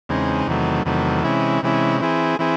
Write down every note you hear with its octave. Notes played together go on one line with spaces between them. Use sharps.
E2 C#3 G#3 C4 D#4
E2 C3 D#3 F#3 A3
E2 C3 D#3 F#3 A3
C3 E3 G#3 C#4 E4
C3 E3 G#3 C#4 E4
E3 C4 E4 G#4
E3 C4 E4 G#4